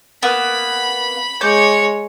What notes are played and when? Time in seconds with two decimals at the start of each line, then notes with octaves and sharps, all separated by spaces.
0.23 A#3 B3 B5
1.41 G#3 C#5 D6 G6